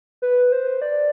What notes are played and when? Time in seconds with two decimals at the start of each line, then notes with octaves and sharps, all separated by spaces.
0.22 B4
0.52 C5
0.82 D5